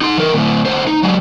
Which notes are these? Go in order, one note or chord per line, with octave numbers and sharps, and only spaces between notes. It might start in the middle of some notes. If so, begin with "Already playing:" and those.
D#4 C6
E3 A#4
D2 A2
D3 C5
D#4
F#3 G#3